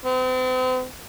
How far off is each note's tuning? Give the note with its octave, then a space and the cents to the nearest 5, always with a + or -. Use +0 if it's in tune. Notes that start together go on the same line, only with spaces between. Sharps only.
C4 -40